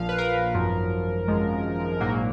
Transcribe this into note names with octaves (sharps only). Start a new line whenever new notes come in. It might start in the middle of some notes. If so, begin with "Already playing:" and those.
Already playing: A#1 A#2 F3 F5
B4
A#4
G#1 F#2 F3
G#1 F#2 F3 G#3
A#1 G#2 F#3 A#3